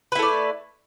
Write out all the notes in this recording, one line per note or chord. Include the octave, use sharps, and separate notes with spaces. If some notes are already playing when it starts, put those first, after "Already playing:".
A3 E4 B4 D5